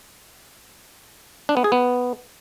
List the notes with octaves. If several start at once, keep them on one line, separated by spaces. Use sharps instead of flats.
D4
B3
G#4
B3